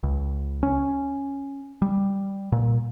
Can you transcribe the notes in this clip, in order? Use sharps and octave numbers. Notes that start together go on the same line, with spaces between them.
C#2
C#4
G3
A#2